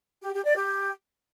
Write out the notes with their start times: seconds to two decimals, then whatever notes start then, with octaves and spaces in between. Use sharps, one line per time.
0.23 G4
0.34 G4
0.45 D5
0.56 G4